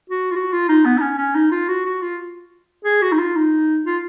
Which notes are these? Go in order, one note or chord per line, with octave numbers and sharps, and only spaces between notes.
F#4
F4
F#4
F4
D#4
B3
D#4
C#4
C#4
D#4
F4
F#4
F#4
F4
G#4
F#4
D#4
F4
D#4
F4